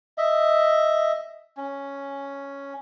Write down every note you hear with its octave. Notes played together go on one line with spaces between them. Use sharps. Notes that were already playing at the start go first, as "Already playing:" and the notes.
D#5 E5
C#4